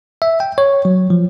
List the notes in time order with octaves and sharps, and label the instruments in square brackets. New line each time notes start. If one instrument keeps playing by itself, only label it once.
[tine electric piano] E5
G5
C#5
F#3
F3